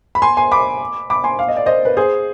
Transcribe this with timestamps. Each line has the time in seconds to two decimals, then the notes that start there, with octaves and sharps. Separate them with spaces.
0.15 B5
0.22 G#5 C6
0.37 G#5 C6
0.52 B5 D6
1.10 B5 D6
1.24 G#5 C6
1.39 F5
1.48 D#5
1.56 D5
1.66 C5 D#5
1.85 B4
1.97 G#4 C5